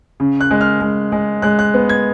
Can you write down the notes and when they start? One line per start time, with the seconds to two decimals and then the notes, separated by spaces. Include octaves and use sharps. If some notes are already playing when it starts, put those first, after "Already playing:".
0.20 C#3
0.41 F#6
0.51 G#3
0.61 F6
0.81 G#3
1.12 G#3
1.42 G#3 F#6
1.59 F#6
1.74 B3
1.89 G#6